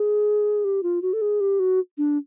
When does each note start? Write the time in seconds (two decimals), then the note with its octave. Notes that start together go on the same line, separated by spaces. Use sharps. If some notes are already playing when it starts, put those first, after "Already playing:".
Already playing: G#4
0.64 G4
0.83 F4
1.02 F#4
1.13 A4
1.21 G#4
1.40 G4
1.59 F#4
1.98 D4